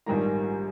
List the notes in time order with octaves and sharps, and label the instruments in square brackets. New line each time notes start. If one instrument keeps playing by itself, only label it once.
[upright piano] A#1 G#2 D#3 G3 A#3 A#5